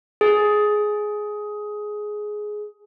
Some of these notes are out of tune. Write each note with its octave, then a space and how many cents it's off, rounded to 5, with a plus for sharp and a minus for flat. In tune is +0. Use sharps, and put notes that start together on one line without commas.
G#4 +10